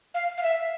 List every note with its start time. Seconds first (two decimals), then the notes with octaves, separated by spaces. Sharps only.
0.14 F5
0.38 F5
0.43 E5